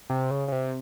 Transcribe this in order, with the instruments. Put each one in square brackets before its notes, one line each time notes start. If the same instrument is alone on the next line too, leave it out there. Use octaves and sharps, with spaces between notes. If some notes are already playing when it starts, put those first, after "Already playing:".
[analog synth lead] C3
C#3
C#3
C3